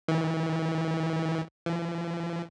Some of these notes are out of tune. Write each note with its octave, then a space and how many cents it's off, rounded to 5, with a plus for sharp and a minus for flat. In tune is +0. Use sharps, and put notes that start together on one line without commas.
E3 -35
E3 +45